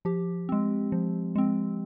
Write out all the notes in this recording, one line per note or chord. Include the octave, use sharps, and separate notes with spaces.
F3 G4
G#3 C4
F3
G#3 C4